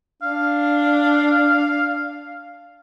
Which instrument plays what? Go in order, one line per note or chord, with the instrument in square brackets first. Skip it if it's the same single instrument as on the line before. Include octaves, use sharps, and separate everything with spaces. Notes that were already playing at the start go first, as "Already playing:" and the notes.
[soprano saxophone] D4 [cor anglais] F5